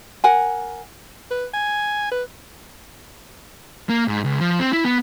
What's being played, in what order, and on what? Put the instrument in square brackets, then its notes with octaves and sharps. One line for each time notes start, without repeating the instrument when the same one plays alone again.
[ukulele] A#4 F#5 G#5
[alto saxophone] B4
G#5
B4
[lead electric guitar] A#3
G#2
C#2
F3
C4
E4
B3